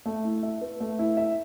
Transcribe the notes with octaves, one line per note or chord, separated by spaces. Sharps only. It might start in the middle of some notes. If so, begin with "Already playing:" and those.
A3
E4
E5
B4
A3
E4
E5